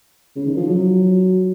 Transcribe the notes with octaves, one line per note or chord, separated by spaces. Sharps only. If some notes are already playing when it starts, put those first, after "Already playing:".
C#3
D#3
F3
F#3